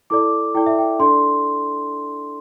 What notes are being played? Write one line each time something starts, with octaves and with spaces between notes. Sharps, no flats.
E4 A4 D5 D6
E4 A4 D5 G5
E5
G5
D4 A4 D5 C6